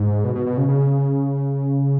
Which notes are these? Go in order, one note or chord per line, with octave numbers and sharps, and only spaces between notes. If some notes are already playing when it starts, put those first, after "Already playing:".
Already playing: G#2
B2
B2
B2
C#3
C#3